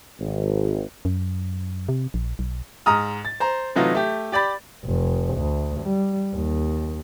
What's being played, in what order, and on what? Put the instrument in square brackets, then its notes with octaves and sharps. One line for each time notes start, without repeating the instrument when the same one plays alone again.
[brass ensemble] G#1
[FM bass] F#2
C3
A#1
B1
[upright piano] G#2 A#5 D#6 F6
A6
C5 A#5
C3 E3 F#3 A3 D#4 F4
A3 G4
G4 D5 B5 A6
[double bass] F1
D2
G3
D#2